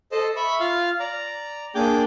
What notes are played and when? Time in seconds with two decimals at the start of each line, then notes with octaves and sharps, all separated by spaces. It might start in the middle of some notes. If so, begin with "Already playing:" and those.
0.12 A4 C5 D#5 A5
0.36 E5 B5 C#6
0.60 F4 F5
1.00 D5 A#5
1.75 A#3 D4 G#4 G5 D6 G6